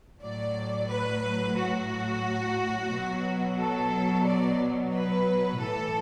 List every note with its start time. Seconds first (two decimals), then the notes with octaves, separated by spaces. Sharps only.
0.22 A2 F#3 D5
0.89 B4
1.57 F#4
2.91 B2 F#3
3.58 A4
4.25 D5
4.93 B4
5.59 A2 E3 A4